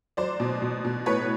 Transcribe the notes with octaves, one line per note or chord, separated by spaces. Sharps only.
F#3 C5 D5
B2
B2
B2
A2 B4 C#5